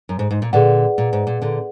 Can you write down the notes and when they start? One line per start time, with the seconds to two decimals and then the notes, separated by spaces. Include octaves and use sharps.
0.09 F#2
0.19 G#2
0.31 G#2
0.42 A#2
0.53 A#2 D3 G#4 B4 D5 F#5
0.98 A#2
1.13 G#2
1.27 A#2
1.42 A#2 D3